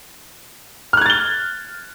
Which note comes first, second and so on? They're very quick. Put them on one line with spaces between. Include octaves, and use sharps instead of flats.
F6 F#6 G#6 A6 G7